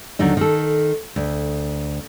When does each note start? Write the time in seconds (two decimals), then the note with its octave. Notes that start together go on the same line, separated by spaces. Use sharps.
0.19 D#2 D3 F#3 D#4
0.37 D#3 A4
1.16 D2